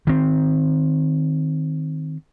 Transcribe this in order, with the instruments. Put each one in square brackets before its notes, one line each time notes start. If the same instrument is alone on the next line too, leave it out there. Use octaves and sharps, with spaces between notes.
[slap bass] D#3 C4